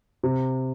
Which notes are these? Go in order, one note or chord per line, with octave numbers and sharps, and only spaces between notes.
C3